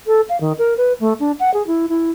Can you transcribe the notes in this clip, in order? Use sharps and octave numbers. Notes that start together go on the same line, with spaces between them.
A4
F5
D#3
A#4
B4
A3
D4
F#5
G#4
E4
E4